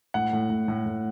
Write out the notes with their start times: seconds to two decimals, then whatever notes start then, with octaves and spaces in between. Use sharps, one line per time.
0.14 A2 F#5
0.33 A2
0.50 A2
0.68 A2
0.86 A2